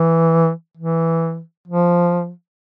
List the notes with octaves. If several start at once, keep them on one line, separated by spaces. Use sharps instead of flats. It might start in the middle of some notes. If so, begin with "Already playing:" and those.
Already playing: E3
E3
F3